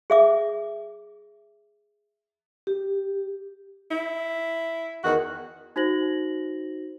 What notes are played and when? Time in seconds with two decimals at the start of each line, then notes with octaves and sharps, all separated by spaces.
0.10 G#4 E5 D6
2.67 G4
3.91 E4
5.03 E2 D#3 F#4
5.76 D#4 F#4 C5 A#6 F#7